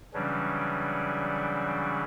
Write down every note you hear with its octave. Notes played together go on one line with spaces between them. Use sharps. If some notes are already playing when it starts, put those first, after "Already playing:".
C#3 E3 F#3 G3 C#4 D4